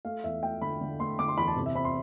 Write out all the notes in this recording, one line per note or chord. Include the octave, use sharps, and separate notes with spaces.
A3 F5
E2 E5
A3 G5
D3 B5
D3
A3 C6
D3 D6
C6
E2 B5
A5
C3
E5
C4 B5
C6